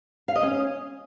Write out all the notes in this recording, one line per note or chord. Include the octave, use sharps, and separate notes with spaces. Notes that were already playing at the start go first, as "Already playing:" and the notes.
F5
D#5
C#4